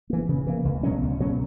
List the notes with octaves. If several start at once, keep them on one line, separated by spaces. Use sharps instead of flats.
E3 A#3
C#3
E3 A#3
C#2
B2 F#3 C#4
C#2
B2 F#3 C#4